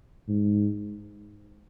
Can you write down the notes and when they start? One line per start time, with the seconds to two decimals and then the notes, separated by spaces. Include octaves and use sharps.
0.28 G#2